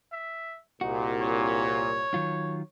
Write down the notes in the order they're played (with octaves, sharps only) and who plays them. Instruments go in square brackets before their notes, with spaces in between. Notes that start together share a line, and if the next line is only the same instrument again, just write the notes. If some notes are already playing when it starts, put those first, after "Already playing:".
[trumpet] E5
[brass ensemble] C2 A#2 [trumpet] D#4 [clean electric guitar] F#4
[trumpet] C#5
[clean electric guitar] D#3 F#3 F4